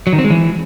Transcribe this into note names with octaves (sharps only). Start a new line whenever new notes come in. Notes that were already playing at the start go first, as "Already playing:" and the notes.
F#3
D#3
C4
G#3
E3